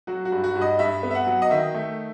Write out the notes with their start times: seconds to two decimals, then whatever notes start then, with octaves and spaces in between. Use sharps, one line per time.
0.07 F#3 F#4
0.25 F#4
0.32 G2
0.44 F#4
0.55 G2
0.61 D#5
0.79 G2 E5
1.03 B3
1.11 E5
1.15 F#5
1.27 F#3
1.42 D#5
1.50 D#3 E5
1.74 A3